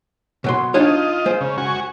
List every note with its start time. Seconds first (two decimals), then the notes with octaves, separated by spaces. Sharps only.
0.44 B2 F#3 C6
0.74 D4 D#4 F4 C#5 D#5
1.26 G#3 C5
1.41 C#3
1.58 F#4 G#5 C#6